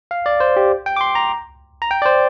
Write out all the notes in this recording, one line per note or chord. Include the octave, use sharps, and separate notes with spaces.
F5
D5
C5
G4
G5
D6
C6
A#5
A#5
G5
D5
C5